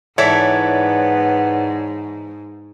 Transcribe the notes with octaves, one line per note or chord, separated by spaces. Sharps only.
G#2 E3 B3 E4 A4 C#5 D5 G#6